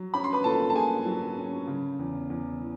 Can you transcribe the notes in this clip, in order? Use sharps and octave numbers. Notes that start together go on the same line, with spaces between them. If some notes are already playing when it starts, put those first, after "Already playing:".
Already playing: F#3
C#4 B5
C6
B4 B5
A#2 A4 A5
A5
A#3 G#4 G#5
F#3
C#4
C#3
E2
E2
E3